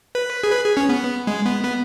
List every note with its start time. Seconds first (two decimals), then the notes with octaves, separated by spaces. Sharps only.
0.15 B4
0.44 G#4
0.52 B4
0.64 G#4
0.77 C#4
0.89 B3
1.27 G#3
1.46 B3
1.64 B3